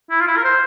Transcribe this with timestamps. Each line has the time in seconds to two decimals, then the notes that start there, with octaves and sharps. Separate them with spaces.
0.10 E4
0.20 F4
0.27 E4
0.37 A#4
0.44 C5